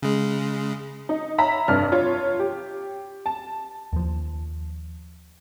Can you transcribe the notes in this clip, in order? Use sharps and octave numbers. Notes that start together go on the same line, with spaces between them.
C#3 G#3
D#4
C#5 E5 A#5 B5 B6
F1 G2 D4 F6
F4 C#5
G4
A5
D#2 F3